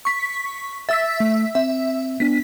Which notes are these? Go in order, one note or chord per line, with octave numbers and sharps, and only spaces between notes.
C#6 B6
E5 E6 A6 B6
A3
C4 E5
B3 D4 B6